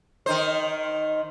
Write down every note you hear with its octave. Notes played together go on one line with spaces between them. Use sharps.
D#3 D#4 C5